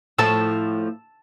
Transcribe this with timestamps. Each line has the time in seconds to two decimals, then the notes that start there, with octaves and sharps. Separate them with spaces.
0.18 A2 F3 A3 A5 E6